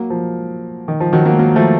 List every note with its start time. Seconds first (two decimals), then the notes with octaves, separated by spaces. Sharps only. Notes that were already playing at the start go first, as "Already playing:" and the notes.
Already playing: F#3 A#3
0.10 F3
0.88 D#3
1.00 F3
1.13 D#3 F#3
1.26 F#3 A#3
1.39 F#3 A#3
1.56 F3 A3